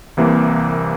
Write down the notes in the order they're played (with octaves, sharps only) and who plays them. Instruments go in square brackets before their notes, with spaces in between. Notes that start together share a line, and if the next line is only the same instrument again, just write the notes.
[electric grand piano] C2 C3 E3 A#3